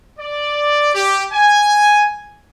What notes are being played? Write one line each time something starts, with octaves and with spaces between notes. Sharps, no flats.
D5
G4
G#5